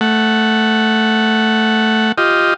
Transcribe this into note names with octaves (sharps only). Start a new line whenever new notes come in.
A3 F#5
F4 G4 D#5